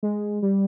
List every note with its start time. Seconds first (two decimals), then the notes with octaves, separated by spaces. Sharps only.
0.03 G#3
0.42 G3